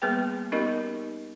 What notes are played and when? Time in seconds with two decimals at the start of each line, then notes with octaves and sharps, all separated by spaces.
0.02 G3 A#3 B3 G#4 B4 G5
0.52 B3 C#4 D#4 G4 A#4 D#5